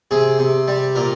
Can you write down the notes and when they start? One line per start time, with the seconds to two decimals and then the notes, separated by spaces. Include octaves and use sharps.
0.11 C3 G#4
0.39 C3
0.68 G3
0.96 A#2 A#4